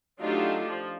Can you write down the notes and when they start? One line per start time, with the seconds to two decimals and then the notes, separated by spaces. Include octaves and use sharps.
0.20 F#3 A3 D4 D#4 F4 G4
0.67 F3